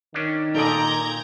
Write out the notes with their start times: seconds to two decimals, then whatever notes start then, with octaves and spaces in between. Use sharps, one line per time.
0.14 D#3 C#4 D4
0.55 A#2 D#4 A4 D5 D#5 A#5 G6 G#6